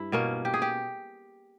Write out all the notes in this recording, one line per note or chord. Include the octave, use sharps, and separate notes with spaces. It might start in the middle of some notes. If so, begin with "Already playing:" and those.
Already playing: G2 E4
B2 A#3 C#4
G4
G#4
G4